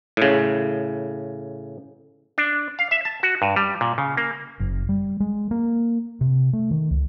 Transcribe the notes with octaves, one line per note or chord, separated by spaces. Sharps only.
A2 C#3
D4
F5
E5
A5
F#4
G2
G3
A#2
C#3
A#3
F#1
G3
G#3
A#3
C3
A3
D#3
C#2